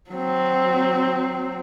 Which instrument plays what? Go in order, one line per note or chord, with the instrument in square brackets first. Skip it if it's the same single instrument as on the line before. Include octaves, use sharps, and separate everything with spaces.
[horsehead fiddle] F#3 C4